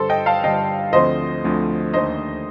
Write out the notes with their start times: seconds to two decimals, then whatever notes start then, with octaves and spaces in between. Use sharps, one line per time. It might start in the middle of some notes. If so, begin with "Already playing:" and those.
Already playing: G2 D3 G3 A4 C5
0.09 D#5 G5
0.26 F5 A5
0.44 G2 D3 G3 D#5 G5
0.93 D2 D3 F3 A3 C4 C5 D#5
1.43 D2 D3 F3 A3 C4
1.93 D#2 D3 A3 D#4 C5 D#5